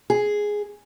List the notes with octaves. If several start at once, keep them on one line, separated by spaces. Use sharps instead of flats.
G#4